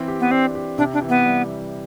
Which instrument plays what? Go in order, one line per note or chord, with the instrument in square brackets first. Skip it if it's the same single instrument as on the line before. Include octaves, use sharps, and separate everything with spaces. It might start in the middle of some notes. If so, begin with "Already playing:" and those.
Already playing: [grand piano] E3 C4
G4
[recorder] B3
[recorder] C4 [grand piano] D4
[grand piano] G4
[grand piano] C3 [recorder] D4
[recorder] D4
[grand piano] E3
[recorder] B3
[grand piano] G3